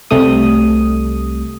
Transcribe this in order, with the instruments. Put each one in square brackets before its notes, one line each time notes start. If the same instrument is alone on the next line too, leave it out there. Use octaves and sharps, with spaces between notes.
[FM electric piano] C2 C3 G3 A3 D#6